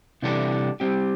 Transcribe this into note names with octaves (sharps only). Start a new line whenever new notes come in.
C3 E3 G3 D4 A4
G3 C4 G4